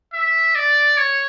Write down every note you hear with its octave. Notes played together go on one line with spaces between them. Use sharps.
E5
D5
C#5